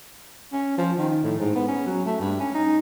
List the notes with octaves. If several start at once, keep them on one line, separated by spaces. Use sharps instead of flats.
C#4
F3
D#3
A2
G#2
B3
C#4
F#3
A3
G2
C#4
D#4